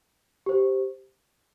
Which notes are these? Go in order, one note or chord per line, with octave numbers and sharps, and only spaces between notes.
G4 C5